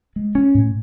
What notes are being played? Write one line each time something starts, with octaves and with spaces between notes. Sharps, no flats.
G#3
C#4
A2